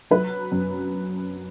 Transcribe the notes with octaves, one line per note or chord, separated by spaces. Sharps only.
F#3 B4
F#2